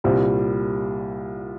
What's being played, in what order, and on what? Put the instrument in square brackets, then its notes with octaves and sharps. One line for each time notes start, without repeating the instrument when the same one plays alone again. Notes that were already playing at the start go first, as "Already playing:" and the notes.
[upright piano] C2 A#2 G3 C4